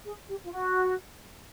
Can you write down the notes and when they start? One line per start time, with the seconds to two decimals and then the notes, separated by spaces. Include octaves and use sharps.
0.05 G#4
0.28 G4
0.44 F4
0.52 F#4